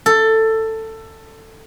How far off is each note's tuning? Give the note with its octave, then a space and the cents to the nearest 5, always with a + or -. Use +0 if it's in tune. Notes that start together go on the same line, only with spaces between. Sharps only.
A4 +15